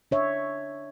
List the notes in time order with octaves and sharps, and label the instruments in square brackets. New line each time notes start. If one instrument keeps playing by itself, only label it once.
[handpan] D4 C#5 E5